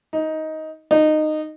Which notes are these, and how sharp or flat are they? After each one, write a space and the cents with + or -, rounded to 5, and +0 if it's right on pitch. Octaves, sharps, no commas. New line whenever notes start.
D#4 +15
D#4 -15